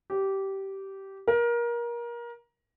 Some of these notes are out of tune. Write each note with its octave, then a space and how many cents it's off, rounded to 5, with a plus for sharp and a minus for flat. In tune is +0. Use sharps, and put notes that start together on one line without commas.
G4 -15
A#4 +25